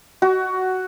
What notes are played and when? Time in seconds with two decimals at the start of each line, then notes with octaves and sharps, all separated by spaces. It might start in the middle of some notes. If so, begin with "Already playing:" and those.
0.22 F#4